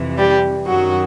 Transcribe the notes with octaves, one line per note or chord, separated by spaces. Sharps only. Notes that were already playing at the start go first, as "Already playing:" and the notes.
Already playing: F2 C3 E3
G3 G4
F#2 D#3 F#3 F#4